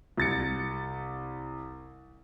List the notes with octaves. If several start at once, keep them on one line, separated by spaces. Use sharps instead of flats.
C2 A6 C#7